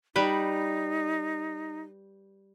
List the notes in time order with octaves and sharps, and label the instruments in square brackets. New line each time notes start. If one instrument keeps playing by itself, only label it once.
[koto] G3 B4 [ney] D#4